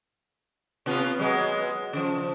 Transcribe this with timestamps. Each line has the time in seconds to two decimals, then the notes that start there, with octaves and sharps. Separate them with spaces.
0.86 C3 B3 F4
1.19 F#3 G#3 B3
1.93 C#3 F3